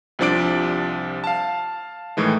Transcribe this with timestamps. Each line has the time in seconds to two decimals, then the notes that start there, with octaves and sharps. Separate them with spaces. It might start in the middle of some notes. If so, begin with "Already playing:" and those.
0.19 C2 C3 F3 D4 D5 D7
1.24 F5 A5
2.17 A2 D#3 E3 G#3